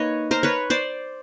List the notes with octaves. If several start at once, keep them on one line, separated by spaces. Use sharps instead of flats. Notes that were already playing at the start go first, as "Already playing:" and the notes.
Already playing: A#3 D#4 B4 C#5 D#5
A#4 C5
B4 C#5
C5 D5